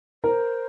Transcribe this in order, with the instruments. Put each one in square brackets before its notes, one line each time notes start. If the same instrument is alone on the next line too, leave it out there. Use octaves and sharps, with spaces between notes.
[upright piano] A#4 [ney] C5